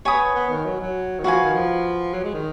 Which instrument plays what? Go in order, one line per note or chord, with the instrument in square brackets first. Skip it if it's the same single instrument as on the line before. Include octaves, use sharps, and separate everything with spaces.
[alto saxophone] B3 [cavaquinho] C#5 G#5 B5 D#6
[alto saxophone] B3
D#3
F#3
F#3
D#3
[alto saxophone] F3 [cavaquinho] F#4 B4 F5 G#5
[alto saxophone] D#3
F3
F#3
G#3
D#3